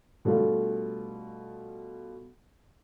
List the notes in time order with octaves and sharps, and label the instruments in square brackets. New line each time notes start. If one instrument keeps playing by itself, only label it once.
[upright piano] B2 G3 A3 D4 F4